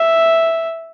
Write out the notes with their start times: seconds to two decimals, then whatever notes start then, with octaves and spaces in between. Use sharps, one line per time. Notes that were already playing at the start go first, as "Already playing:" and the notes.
Already playing: E5